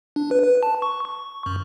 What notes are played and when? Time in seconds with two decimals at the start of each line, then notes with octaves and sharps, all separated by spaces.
0.16 D4
0.31 B4
0.44 B4
0.63 A5
0.82 C#6
1.05 C#6
1.46 F#2